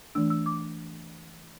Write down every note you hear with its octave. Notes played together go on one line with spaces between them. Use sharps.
E3 A3 D4 E6
E6
D6